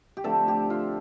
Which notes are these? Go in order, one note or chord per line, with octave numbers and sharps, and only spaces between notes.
G4
D3 F3 A3 C4 A4
G4
F4